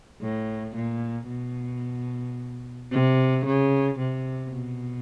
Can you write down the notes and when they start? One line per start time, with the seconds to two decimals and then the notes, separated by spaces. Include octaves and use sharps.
0.22 A2
0.76 A#2
1.29 B2
2.92 C3
3.45 C#3
3.99 C3
4.53 B2